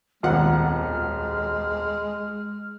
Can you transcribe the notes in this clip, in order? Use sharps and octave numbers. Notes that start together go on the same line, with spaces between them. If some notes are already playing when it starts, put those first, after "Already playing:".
D#1 B1 F2 D#3 G#3 F4 F#5 F6